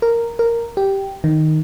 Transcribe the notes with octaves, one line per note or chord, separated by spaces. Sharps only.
A#4
A#4
G4
D#3